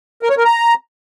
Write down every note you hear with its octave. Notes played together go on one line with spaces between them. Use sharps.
A#4
C#5
A#4
A#5